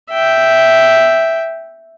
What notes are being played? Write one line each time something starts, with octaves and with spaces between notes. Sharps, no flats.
E5 G5